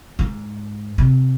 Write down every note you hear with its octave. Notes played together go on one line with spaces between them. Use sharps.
G#2
C3